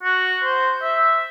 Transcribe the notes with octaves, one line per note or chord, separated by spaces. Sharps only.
F#4
C5
E5